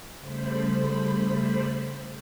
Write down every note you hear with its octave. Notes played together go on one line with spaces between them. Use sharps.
C#3 G3 A3 C5 B5